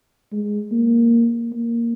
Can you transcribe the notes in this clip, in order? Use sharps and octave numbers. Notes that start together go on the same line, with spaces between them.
G#3
A#3
A#3